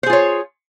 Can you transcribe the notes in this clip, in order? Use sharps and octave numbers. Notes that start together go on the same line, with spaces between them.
F4 G#4 C5 C#5